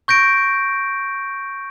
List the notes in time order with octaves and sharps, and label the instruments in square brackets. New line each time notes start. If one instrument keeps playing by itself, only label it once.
[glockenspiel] C#6 G6 A#6 D7